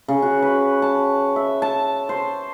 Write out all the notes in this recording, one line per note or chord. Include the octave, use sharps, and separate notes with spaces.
C#3
F#4
B4
A5
E5
A5
C5